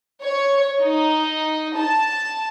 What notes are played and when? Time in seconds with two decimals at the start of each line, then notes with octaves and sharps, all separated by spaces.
0.21 C#5
0.81 D#4
1.76 A5